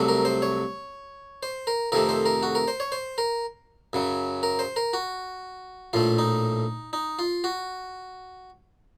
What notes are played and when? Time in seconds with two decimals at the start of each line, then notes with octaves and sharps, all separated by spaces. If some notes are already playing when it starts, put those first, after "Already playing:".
Already playing: C2 C3 F#3 A3
0.08 A#4
0.25 C5
0.42 C#5
1.43 C5
1.67 A#4
1.92 F2 C3 D#3 A3 A#4
2.09 C5
2.26 A#4
2.43 F#4
2.55 A#4
2.68 C5
2.80 C#5
2.92 C5
3.18 A#4
3.93 F#2 C#3 F#3
4.43 A#4
4.59 C5
4.76 A#4
4.93 F#4
5.93 A#1 A2 A3 F4
6.18 D#4
6.93 D#4
7.19 F4
7.44 F#4